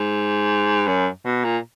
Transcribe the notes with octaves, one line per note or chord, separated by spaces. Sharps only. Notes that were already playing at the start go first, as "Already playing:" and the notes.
Already playing: G#2
F#2
B2
A#2